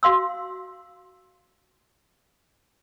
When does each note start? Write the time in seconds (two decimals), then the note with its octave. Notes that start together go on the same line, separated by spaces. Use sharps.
0.03 F#4 F5 C6 E6